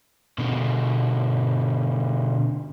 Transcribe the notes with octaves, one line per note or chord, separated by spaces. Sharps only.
B2 D3